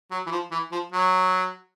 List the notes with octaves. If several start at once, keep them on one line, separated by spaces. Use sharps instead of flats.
F#3
E3
F3
E3
F3
F#3